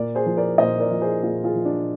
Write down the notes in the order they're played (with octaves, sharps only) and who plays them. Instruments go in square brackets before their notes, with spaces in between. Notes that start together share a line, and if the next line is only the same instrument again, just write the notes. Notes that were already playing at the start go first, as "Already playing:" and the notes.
Already playing: [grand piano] A#2 A#4 D5
G#4 C5
F3
A#4 D5
A#2 C5 D#5
A#4 D5
F3
G#4 C5
A#2 F4 G#4
F4 G#4
F3
D4